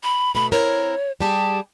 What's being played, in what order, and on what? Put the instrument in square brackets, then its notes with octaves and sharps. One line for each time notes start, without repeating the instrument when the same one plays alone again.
[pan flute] B5
[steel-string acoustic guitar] B2 A3 [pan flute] B5
[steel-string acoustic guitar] C4 E4 A#4 [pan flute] C#5
[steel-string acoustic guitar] G3 G4 G#4 [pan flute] A5